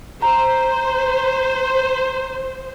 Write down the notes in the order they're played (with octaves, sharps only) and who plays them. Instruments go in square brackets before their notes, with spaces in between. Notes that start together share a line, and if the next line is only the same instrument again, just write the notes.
[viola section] C5 [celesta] A#5